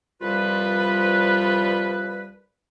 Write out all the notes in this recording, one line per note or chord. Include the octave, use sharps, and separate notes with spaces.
C2 F3 G3 F4 B4